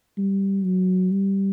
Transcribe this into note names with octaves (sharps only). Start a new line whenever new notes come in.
G3
F#3
G3